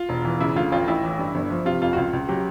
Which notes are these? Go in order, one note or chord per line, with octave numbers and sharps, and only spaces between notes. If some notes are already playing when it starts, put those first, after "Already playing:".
Already playing: F4
E1
E3
C#3 E4
D2 F4
A1 F4
A1 E4
E3
G2
G1
F3
C3 F4
F2 F4
F#4
C#2 F4
C#2
F#3 G4